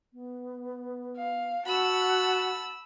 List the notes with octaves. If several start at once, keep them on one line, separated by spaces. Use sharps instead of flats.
B3
F5
F#4 F#5 A5 B5 E6